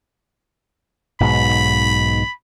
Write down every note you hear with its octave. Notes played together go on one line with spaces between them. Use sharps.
B1 G#2 B2 B5